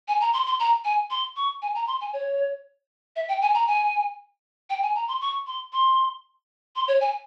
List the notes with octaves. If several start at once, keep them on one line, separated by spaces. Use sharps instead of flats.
G#5
A#5
C6
C6
A#5
G#5
C6
C#6
G#5
A#5
C6
G#5
C#5
E5
G5
G#5
A#5
G#5
G5
G#5
A#5
C6
C#6
C6
C6
C6
C#5
G#5